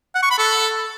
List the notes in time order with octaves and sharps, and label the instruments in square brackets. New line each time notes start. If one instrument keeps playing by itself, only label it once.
[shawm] F#5
C#6
B5
A4